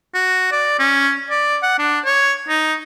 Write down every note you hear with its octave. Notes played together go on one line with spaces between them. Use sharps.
F#4
D5
C#4
D5
F#5
D4
C#5
D#4